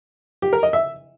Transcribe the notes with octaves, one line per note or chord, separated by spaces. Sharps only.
G4
A#4
D#5
E5